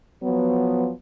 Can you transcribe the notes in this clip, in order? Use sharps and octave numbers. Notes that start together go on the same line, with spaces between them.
F3 F#3 B3